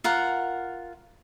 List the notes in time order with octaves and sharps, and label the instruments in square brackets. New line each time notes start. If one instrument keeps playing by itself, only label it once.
[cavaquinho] F4 A#4 F#5